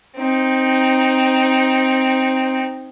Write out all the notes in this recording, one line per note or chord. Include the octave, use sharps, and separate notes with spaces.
C4 D#4